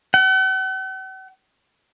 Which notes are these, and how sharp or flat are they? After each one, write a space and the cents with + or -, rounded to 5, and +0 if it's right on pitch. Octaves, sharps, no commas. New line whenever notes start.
F#5 +45